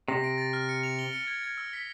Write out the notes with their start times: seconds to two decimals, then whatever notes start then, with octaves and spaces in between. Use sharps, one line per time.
0.08 C3 A#6
0.24 D7
0.38 A6
0.53 F6
0.69 C#7
0.83 F7
0.99 G7
1.13 C#7
1.27 G#6
1.44 G#6
1.57 E6
1.73 B6